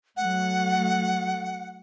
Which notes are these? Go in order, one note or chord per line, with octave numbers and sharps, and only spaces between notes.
F#3 A3 F#5